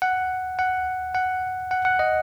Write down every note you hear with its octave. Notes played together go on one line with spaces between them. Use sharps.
F#5
F#5
F#5
F#5
F#5
D#5